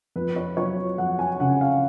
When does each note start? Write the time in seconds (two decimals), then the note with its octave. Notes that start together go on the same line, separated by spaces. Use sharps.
0.16 F2 B4
0.36 C#5
0.57 F#3 C#5
0.98 F2 F#5
1.19 G#5
1.40 C#3 F#5
1.61 F5